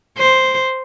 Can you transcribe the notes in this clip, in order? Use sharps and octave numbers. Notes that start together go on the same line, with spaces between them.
C5